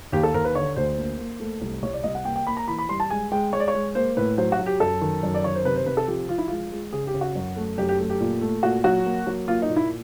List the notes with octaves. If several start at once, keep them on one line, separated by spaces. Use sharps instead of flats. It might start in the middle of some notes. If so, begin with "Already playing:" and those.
D#2 G4
A4
D#2 A#4
B4
D3 C#5
D2 C5
A#3
A#3
A3
C2
C2 C#5
D5
C2 D#5
F#5
A#3 G5
G5
A#3 B5
A#5
E3 B5
B5
G3 C6
A5
G#3 G#5
G#3 G5
G#3 C#5
D5
C#5
G#3
A#3 C5
A2 B4
F#3 C5
F#4
F#3
G4
F#2 A4
D#3
F#2
D5
D#3 C#5
C5
C3 B4
C5
C3 B4
A4
F3 G4
F3 F4
E4
G#3 F4
G#3
C#3 G#4
G4
C#3
F#4
F#2
A3
F#2 G4
G4
A3
G4
A#2
A3
A#2 F#4
F#3 F#4
A#3
F#3
A#3 F4
D#4
A#2
E4